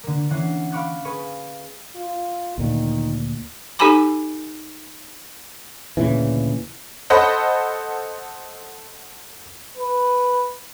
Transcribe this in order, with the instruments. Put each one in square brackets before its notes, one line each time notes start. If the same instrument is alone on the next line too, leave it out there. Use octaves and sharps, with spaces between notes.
[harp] D3 A#3
E3 C#4 F#5 F#6 C7
F5 B5 C#6 D6 F#6
G#4 B4 F5 C#6
[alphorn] F4
[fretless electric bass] D2 A#2 [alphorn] D#3
[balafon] D#4 G4 A4 G#5 B5 D6
[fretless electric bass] D2 A#2 C#3 E3
[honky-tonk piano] A4 C5 D#5 F#5 B5
[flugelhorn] B4